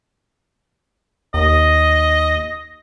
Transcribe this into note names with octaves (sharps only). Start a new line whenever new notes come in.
D#2 D#5